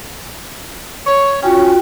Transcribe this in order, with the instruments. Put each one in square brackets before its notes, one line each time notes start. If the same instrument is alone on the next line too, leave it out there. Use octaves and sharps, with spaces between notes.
[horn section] C#5
[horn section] C#4 [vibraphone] F4 F#4 G5